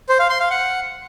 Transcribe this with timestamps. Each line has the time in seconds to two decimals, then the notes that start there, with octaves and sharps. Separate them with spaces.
0.09 C5
0.19 F5
0.30 C6
0.40 F5
0.50 F#5